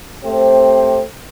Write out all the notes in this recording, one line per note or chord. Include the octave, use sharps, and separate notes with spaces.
A3 C4 G4 C5